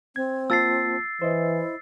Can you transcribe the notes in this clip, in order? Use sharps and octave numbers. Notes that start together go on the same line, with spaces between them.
C4 G#6
A#3 F4 A5 E6 A6 C7
E3 E4 C5 D#5